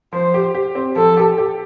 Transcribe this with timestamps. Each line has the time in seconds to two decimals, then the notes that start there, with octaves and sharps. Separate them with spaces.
0.13 F3 C5
0.34 G4
0.55 G4
0.75 C4
0.96 F3 A4
1.17 G4
1.38 G4